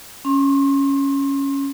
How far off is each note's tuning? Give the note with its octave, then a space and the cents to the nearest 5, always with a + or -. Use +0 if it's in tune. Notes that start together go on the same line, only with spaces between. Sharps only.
C#4 +0 C6 +35